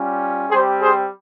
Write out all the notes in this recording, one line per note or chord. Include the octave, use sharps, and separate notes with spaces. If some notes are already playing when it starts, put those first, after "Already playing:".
Already playing: G3 C#4 F4
G3 C4 G4 G#4 C5
G#4 C5